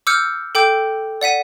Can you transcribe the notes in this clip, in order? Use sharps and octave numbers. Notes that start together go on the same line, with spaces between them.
D6 E6 F6 G6 C#7
A4 G5 D6 G6
D5 F#5 B6 D#7